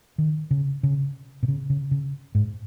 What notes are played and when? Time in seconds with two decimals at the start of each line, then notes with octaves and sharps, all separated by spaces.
0.18 D#3
0.51 C#3
0.83 C#3
1.43 B2
1.48 C#3
1.70 C#3
1.91 C#3
2.35 G#2